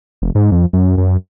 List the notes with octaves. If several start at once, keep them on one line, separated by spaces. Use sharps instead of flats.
F1
G#2
F2
F#2
F#2